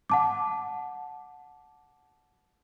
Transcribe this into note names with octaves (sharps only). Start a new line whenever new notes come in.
F#5 A5 D6